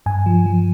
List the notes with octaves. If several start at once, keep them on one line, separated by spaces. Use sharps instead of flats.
G2 G#5
F3
F3